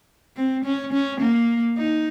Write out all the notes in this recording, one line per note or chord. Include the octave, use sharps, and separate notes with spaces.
C4
C#4
C#4
A#3
D#4